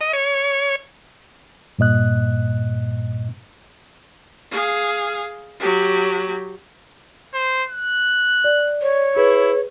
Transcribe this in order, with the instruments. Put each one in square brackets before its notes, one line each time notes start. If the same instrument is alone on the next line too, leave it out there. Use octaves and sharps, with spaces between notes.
[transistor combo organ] D#5
C#5
[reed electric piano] G2 A#2 D#5 F#6
[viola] G#4 F5
F#3 G4
[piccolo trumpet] C5
F#6
[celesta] D5
[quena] C#5
[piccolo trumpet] E4 [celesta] G#4 B4